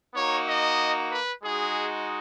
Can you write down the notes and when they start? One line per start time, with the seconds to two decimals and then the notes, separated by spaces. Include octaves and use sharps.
0.15 A#3 D#4 F#4 C#5
0.47 D#5
1.10 B4
1.43 G#3 D#4 F#4 G#4